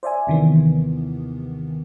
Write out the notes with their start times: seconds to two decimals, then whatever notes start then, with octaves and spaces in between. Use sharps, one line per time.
0.03 C5 D5 E5 G#5
0.27 D#2 C3 D#3 E3 B3